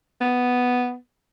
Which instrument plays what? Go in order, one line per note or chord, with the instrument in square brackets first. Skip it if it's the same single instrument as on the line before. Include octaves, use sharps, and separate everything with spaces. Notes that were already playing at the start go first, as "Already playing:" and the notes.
[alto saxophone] B3